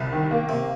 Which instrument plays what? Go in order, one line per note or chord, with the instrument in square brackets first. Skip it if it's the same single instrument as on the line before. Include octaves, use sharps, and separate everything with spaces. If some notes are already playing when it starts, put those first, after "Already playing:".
Already playing: [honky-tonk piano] C2 [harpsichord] C3
[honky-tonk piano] D#3
A#3
[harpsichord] C3 [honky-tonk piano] A#3